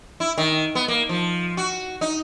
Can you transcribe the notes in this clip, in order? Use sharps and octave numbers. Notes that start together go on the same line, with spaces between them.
E4
D#3
B3
A#3
F3
F#4
D#4